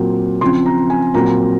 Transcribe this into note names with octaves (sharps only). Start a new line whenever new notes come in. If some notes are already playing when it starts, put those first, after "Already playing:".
Already playing: A#2 F#3 C4
C#3 F3 C4 C6
A#5
G#5
A#2 F#3 C4 A#5